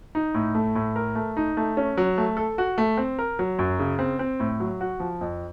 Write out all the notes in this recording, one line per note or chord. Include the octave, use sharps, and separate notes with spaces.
D#4
A2
A3
A2
A#4
A3
D#4
A3
C#4
F#3
A3
A4
F#4
A3
C4
A#4
F#3
F#2
C#3
C4
C4
A2
F#3
F#4
F3
F2